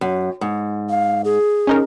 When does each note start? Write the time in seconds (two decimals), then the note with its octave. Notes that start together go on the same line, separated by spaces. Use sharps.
0.01 F#2
0.41 G#2
0.90 F5
1.25 G#4
1.67 C#4 D#4 A#4